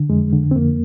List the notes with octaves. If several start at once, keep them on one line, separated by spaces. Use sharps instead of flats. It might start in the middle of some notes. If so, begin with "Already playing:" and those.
Already playing: D3
F2 G#3
D3
C4
F2 A#3